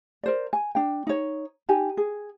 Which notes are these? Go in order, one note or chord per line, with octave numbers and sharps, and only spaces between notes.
A#4 C5 D5
G#5
D4 G5
D#4 C#5
D#4 G4 G#5
G#4